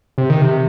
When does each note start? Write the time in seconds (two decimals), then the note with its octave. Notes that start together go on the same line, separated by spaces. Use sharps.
0.18 C3
0.30 D#3
0.42 C3